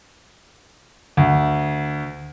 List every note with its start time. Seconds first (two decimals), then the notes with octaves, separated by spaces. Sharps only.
1.17 D2